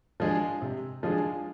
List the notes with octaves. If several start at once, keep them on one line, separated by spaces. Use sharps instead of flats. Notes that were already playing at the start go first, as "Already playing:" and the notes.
F3 G#3 D4 G#4
C3
F3 G#3 D4 G#4